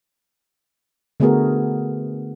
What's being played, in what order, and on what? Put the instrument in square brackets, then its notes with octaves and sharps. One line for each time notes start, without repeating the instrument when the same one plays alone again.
[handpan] D3 A3 B3 F#4 G#4 A#4